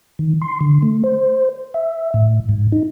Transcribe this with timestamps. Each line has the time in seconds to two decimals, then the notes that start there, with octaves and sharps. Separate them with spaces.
0.19 D#3
0.41 C6
0.61 D3
0.82 A3
1.04 C5
1.74 E5
2.14 A2
2.49 G#2
2.72 D#4